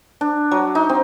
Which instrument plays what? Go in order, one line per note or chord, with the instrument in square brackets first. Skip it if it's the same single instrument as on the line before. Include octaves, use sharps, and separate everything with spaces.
[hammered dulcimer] D4
F#3
D#4
C4